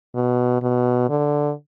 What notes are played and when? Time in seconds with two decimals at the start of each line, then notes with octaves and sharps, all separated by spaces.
0.15 B2
0.62 B2
1.10 D3